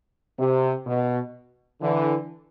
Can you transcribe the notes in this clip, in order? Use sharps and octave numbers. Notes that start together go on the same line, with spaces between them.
C3
B2
D3 E3